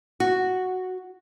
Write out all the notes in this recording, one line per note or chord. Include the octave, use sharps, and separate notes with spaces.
F#4